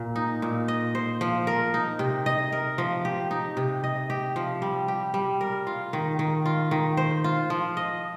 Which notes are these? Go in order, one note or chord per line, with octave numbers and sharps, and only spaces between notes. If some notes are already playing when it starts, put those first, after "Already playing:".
Already playing: A#2
D#4
A#2
D#5
C5
F3
A#4
D#4
C3
D#5
A#4
F3
G4
D#4
C3
D#5
G4
F3
G3
G4
G3
A#4
F4
D#3
D#3
F4
D#3
C5
F4
F3
D#5